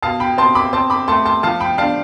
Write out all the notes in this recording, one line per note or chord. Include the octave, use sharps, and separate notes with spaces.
B2 F5 A5
G5 B5
C4 A5 C6
B5 D6
C4 A5 C6
B5 D6
A3 A5 C6
A5 C6
F3 F5 A5
G5 B5
D4 F5 A5